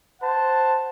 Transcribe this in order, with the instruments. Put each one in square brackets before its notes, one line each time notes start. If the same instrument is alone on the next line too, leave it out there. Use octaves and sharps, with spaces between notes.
[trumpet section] C5 F#5 A5